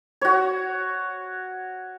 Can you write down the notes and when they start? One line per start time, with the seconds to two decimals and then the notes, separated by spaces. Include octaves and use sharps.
0.21 F#4 C#5